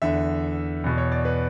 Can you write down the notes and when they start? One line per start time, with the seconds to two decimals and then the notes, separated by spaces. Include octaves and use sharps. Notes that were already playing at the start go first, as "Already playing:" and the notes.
0.02 E2 D3 E5
0.84 E2 B2
0.98 C#5
1.12 D5
1.25 B4